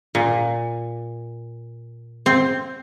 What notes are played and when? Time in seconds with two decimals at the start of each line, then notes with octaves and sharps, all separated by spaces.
0.15 A#2
2.26 C4